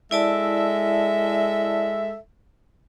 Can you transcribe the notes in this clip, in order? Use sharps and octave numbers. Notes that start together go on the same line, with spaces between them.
G#3 E4 A4 D5 E5 A5